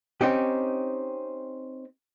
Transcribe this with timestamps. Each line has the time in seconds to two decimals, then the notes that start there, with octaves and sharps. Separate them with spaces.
0.21 C4 C#4 D#4 G4